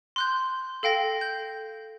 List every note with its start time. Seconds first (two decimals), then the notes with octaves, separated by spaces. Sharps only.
0.16 C6 F#6 G6
0.83 A4 F5 G5 A#6
1.21 G6